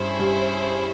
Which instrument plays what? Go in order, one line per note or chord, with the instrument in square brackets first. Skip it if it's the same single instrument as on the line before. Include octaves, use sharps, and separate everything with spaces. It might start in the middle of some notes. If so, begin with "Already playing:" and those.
Already playing: [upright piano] G2 [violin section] C#4 E4 G#4 C5
[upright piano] G2